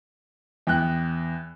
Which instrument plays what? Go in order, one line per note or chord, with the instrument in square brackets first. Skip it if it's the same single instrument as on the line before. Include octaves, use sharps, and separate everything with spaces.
[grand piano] E2 G5 F#6